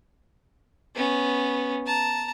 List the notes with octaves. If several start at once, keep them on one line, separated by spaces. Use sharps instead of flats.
B3 C#4
A5 A#5